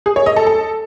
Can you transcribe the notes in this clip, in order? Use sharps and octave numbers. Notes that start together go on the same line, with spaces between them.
G#4
C#5
D#5
A4
A4